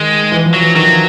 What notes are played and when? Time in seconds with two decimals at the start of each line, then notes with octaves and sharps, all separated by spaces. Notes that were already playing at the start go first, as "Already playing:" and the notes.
Already playing: D#3 G#3
0.32 E3
0.46 F3
0.54 F#3
0.60 E3
0.76 D#3 F#3
0.86 F3